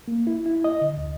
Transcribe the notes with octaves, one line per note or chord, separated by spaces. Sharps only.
A#3
E4
E4
D#5
D3
D2